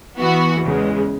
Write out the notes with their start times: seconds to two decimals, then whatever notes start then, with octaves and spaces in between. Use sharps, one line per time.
0.17 E3 B3 F#4
0.61 E2 C#3 G#3